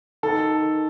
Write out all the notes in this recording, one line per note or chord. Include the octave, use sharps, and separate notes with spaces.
D#3 A4